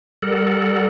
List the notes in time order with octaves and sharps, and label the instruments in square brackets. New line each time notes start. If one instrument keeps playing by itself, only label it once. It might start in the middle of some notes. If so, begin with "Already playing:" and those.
[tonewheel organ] G3 A4 A#4 F#5